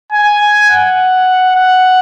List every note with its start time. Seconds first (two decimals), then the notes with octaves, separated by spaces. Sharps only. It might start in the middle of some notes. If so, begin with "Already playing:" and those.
0.12 G#5
0.69 F#5
1.55 F#5